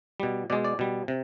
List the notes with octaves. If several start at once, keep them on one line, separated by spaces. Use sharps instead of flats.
B2 G3
B2 G#3 D5
D5
B2 G3
C3